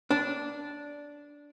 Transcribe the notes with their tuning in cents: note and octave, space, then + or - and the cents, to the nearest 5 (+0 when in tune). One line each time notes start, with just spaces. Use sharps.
D4 -10